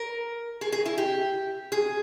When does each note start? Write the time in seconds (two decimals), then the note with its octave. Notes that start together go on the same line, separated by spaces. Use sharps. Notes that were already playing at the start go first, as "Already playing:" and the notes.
Already playing: A#4
0.61 G#4
0.72 G#4
0.86 E4
0.98 G4
1.72 G#4